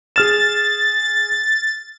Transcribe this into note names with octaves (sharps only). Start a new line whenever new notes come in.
G#4 F6 A6 E7